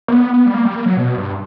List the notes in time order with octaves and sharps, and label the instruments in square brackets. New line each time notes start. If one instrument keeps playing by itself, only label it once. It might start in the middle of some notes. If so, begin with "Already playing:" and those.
[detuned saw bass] A#3
B3
B3
G3
A#3
G3
A#3
F#3
B2
G2